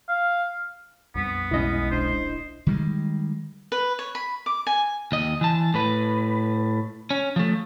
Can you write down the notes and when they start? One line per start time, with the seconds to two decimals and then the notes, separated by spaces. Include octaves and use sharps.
0.08 F5
1.15 A#1 F2 G3 B3
1.51 B1 G#3 C#4 E4 D#5
1.91 D1 A#1 D4 C5
2.67 D#3 G3 G#3
3.72 B4
3.99 C#5
4.15 B5
4.46 D6
4.67 G#5
5.12 D#2 D#5
5.41 E3 A5
5.74 A2 B4
7.11 C#4
7.36 F3 A3